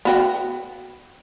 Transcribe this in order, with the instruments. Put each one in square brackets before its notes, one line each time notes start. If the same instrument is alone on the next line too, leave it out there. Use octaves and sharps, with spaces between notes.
[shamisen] B3 F#4 G5